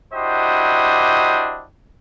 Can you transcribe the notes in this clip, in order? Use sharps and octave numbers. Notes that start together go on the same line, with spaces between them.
D4 E4 F#4 G4 C5 D#5